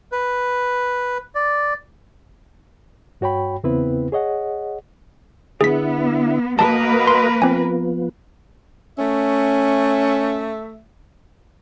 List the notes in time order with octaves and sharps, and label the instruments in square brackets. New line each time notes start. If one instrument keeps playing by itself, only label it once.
[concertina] B4
D5
[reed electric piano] G2 F#4 C#5 G5 B5
E2 C#3 B3 C4 E4 B4
G#4 C#5 D#5 F#5
[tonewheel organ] D3 E4 [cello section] B3 [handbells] G#4 B6
[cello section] A#3 A#4 B4 [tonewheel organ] F#4 D#5 [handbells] A5
[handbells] C6
[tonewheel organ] F3 B3 [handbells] C4 G#5
[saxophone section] A3 E5 [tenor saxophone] C#4